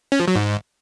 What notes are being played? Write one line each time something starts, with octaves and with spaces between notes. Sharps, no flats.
C#4
F3
F#3
G#2